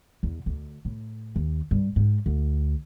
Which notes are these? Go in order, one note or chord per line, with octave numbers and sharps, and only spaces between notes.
E2
D2
A2
D#2
G2
G#2
D2